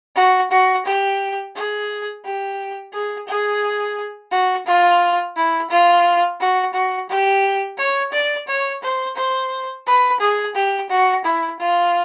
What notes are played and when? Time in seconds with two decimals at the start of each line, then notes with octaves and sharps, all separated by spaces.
0.15 F#4
0.51 F#4
0.85 G4
1.55 G#4
2.24 G4
2.93 G#4
3.27 G#4
4.31 F#4
4.66 F4
5.36 E4
5.70 F4
6.39 F#4
6.73 F#4
7.09 G4
7.77 C#5
8.12 D5
8.47 C#5
8.82 C5
9.16 C5
9.86 B4
10.20 G#4
10.55 G4
10.89 F#4
11.24 E4
11.59 F4